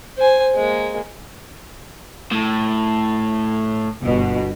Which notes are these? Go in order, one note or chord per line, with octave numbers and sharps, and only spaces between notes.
C5 G#5
G#3 A#3
A2
G1 B2